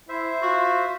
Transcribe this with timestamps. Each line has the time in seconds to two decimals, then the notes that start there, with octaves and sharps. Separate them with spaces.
0.09 E4 C5 E5
0.42 F4 F#4